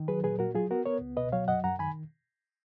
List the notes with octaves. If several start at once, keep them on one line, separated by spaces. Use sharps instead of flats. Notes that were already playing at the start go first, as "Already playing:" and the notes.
Already playing: D#3
F#3 G#4 B4
A#2 G#4 B4
A#2 F#4 A#4
F#3 F4 G#4
B3 F#4 A#4
B3 A#4 C#5
C#2
B2 B4 D#5
F#3 C#5 F5
F#2 D#5 F#5
F#2 F#5 A#5
D#3 G#5 B5